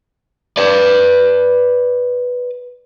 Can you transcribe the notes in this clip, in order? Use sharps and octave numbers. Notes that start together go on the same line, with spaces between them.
B4 D5